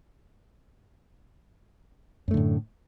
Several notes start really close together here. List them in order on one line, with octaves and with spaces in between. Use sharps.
F#2 A3 D3 A2